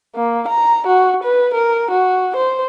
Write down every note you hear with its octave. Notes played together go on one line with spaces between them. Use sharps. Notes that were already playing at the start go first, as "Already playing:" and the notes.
A#3
A#5
F#4
B4
A#4
F#4
C5